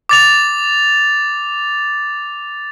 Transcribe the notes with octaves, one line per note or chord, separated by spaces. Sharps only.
D6 A6 F7